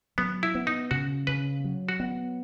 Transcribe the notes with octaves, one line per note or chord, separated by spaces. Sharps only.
F#3 B3
E4
B3
D#4
C#3 F#4
C#3 B4
F#3
F#4
B3